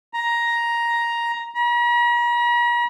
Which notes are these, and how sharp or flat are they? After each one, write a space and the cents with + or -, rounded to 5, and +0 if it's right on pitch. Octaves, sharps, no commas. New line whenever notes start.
A#5 +10
A#5 +45